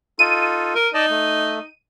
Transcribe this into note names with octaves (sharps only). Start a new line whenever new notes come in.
D#4 F4 A4 D#7
A#4
D#4 D5 D#5 A5
A3